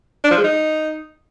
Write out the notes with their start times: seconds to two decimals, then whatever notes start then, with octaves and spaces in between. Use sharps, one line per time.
0.24 D4
0.31 F3
0.37 G#3
0.44 D#4